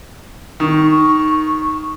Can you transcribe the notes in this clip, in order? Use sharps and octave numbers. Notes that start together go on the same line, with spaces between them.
D#3 C#6